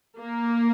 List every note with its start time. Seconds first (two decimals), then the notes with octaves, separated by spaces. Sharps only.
0.19 A#3